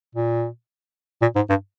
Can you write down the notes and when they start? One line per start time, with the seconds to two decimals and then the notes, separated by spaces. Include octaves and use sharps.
0.15 A#2
1.21 A#2
1.36 G#2
1.49 G2